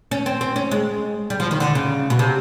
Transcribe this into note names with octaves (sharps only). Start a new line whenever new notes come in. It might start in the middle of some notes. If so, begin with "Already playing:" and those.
C#4
C4
C4
C#4
G#3
G3
F3
D#3
D3
C#3
B2
C3